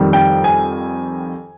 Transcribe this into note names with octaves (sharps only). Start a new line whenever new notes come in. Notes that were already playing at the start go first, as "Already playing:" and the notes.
Already playing: F2 D#3 G3
G5
G#5